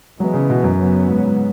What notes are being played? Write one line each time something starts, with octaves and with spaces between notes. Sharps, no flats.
E3 F#3 G#3 B3
C#3
B2
F#2
C#3 F#3 B3
G#2
G#2